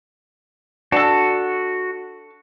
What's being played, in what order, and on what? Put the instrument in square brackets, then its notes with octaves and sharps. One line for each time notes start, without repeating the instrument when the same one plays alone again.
[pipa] D4 A4 [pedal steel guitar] F#4